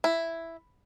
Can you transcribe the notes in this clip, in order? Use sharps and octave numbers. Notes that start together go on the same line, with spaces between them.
E4